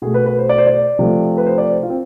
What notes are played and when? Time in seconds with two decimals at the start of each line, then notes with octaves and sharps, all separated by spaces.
0.02 B2 A3 G#4
0.14 B4
0.26 B4
0.39 C5
0.49 D5
0.58 C5
0.67 D5
0.99 C3 F3 A3
1.38 B4
1.46 C5
1.58 D5
1.70 C5
1.83 F4
1.90 C4